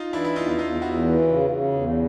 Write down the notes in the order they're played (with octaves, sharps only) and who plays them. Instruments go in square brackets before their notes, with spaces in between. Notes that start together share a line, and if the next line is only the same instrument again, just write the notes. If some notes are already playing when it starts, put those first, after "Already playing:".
Already playing: [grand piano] D#4 F4
[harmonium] E3 [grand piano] D4 E4
[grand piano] E4
[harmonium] E2 [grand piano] D#4 F4
[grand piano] E4
[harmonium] E2 [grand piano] D#4 F4
[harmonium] E2 [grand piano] E4 F#4
[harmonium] E3
C#3
C#3
E2